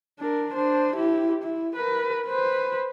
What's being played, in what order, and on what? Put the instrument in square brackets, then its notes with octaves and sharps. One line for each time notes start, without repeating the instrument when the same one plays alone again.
[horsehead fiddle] D4 A#4
D4 C5
E4 G4
E4
A#4 B4
B4 C5